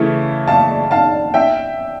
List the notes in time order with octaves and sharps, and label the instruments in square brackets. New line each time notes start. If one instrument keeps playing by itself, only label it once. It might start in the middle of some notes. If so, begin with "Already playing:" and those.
Already playing: [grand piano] C#3 E3 A3 E4
[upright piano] F5 A5
F5 A5
E5 G5